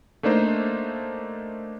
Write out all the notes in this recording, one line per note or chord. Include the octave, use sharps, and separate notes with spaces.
A3 A#3 D4 D#4 C5